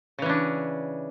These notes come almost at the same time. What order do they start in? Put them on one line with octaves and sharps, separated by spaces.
C#3 E3 C#4 D4